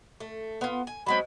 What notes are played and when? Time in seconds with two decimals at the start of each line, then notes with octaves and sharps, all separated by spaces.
0.20 A3
0.61 B3 F4
0.87 G#5
1.06 F#3 G#3 C4 B5